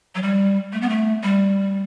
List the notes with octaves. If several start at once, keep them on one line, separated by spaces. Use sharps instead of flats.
F#3
G3
A3
B3
A3
G3